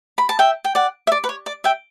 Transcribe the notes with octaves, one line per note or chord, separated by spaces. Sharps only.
B5
A5
E5 G5
G5
D5 F#5
E5
D5
B4
C#5
D5
E5 G5